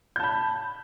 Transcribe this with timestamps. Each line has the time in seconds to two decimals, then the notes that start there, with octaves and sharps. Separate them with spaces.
0.16 G6
0.20 A5
0.23 B5